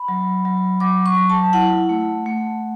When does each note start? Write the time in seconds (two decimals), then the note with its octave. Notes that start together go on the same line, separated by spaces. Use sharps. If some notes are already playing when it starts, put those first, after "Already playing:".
Already playing: B5
0.08 F#3
0.45 F#3
0.80 F#3 D6
1.06 C#6
1.17 F#3
1.30 A5
1.53 E4 F#5
1.89 A3
2.26 A3